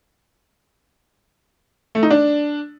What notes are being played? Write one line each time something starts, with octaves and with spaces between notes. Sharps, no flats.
A3
D#4
D4